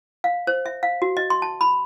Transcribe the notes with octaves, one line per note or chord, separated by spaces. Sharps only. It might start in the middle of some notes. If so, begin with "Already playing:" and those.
F5
C5
E5
F5
F#4
D#5
C6
A5
B5